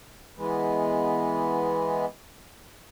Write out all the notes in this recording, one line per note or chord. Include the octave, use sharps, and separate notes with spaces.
E3 G#3 B3